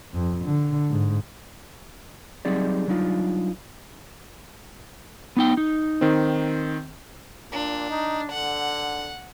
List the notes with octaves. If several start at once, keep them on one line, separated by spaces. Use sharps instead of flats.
F2
D3
G#2
F#3 G3 C4 D#4 G#4 D5
F#3 G3 D4 D#4 F4
B3 D#4 G5
D#4
D#3 C4
A#2 D4
D#4
D3 F#5